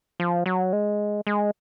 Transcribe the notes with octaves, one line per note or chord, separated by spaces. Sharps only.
F3
F#3
G#3
G#3